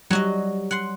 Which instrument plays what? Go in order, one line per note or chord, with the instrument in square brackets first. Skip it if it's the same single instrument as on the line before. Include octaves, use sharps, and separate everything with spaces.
[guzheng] F#3 F#4 D#5 [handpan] G3
[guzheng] F#5 C6